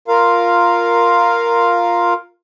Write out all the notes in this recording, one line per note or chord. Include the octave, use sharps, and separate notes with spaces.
F4 A#4 F5